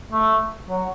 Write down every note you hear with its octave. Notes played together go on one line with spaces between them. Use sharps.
A3
F#3